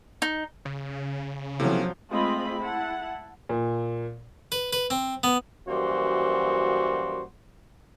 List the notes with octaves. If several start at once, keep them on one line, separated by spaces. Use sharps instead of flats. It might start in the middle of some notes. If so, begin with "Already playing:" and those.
D#4
C#3
A2 C3 F3 F#3 B3 C#4
G#3 A3 C4 F4 D#5 B5
E4 F#5 A5
A#2
B4
B4
C4
B3
F#2 E3 G3 A#3 F#4 C5